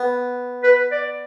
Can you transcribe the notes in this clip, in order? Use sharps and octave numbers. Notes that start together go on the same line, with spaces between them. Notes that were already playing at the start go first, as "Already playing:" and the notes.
Already playing: B3
B4
D5